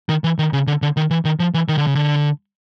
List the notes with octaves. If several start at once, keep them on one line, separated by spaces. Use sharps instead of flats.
D#3
E3
D#3
C#3
D3
D3
D#3
E3
D#3
F3
E3
D#3
D3
C#3
D3